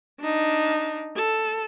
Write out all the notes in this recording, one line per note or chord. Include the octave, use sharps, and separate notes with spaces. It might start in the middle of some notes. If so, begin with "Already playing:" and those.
D4 D#4
A4